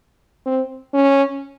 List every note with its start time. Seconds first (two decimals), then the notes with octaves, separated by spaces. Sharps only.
0.46 C4
0.94 C#4